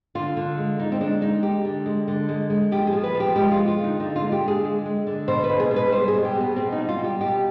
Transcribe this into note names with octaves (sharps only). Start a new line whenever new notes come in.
D3 F4
D3
G#3
D3 D#4
C4
G#3 D4
G#3 D#4
G#3 G4
D3
G#3
D3
G#3
G#3
F3 G4
G#4
F3
B4
F3
G4
G#3 G4
F4
F3
F4
D3
D#4
D3 D#4
F4
G#3
G4
D3
G#4
G#3
G#3
D3
B2 C5
B4
B2
G#4
B2
B4
G3 C5
G#4
B2
G4
B2
B3
B2 C4
D#4
G3
F4
G3
G4
B2 G4